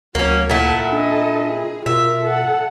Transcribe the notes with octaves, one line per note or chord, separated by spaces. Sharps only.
D2 F#3 A#3 C#4
A#2 E4 A4 F#5
D4 A4 D#5
G#4
B2 F4 A#4 E5
A4 F#5